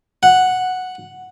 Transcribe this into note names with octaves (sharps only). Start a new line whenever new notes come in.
F#5